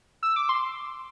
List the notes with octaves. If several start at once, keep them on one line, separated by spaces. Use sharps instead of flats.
E6
D6
C6